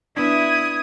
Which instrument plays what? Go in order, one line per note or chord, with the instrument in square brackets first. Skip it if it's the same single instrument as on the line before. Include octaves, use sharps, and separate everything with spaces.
[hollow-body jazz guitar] B3 D4 [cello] E4 E5 [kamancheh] D#6 [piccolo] G#6